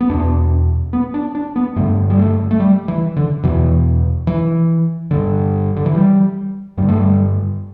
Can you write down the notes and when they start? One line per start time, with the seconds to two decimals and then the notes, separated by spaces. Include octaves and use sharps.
0.01 B3
0.09 E2 B2 D4
0.93 B3
1.14 D4
1.35 D4
1.56 B3
1.76 G2 D3 A3
2.10 G3
2.19 A3
2.51 A3
2.60 G3
2.88 E3
3.16 D3
3.43 E2 B2 E3
4.27 E3
5.11 G2 D3
5.76 D3
5.86 E3
5.95 G3
6.77 G2 D3 G3
6.89 A3
7.00 G3